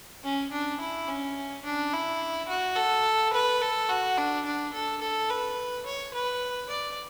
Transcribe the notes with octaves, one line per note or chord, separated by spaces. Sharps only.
C#4
D4
E4
C#4
D4
E4
F#4
A4
B4
A4
F#4
D4
D4
A4
A4
B4
C#5
B4
D5